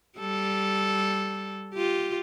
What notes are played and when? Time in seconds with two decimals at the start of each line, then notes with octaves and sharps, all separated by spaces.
0.18 G3 A4
1.74 F4 G4